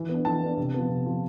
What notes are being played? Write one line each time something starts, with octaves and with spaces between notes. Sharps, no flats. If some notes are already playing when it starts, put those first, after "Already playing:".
Already playing: E3
B3 D4
E3 A5
B3 D4
C3
F3 B3
C3
F3 B3